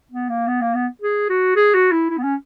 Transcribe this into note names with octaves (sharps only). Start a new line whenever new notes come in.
B3
A#3
B3
A#3
B3
G#4
F#4
G#4
F#4
E4
E4
B3
C#4